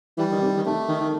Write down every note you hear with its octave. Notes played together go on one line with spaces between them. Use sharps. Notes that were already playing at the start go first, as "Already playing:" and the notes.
E3 G3
D#3
C3
D#3
C3 A3
D#3
D#3